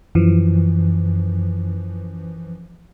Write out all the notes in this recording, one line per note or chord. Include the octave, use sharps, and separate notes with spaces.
F#2 E3 F3